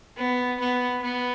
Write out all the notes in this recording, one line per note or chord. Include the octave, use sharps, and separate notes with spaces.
B3
B3
B3